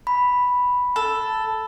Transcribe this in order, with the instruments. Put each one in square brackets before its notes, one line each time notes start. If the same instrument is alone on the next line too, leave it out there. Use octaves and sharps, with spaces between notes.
[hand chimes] B5
[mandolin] A4